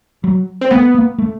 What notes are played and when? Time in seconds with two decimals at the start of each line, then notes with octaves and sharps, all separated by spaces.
0.24 F#3
0.61 C4
0.71 A3 B3
0.95 A#3
1.18 A3